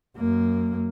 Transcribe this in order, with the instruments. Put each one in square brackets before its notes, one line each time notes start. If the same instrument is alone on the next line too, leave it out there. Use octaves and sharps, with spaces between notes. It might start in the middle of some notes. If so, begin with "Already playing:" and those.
[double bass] F#2 A#3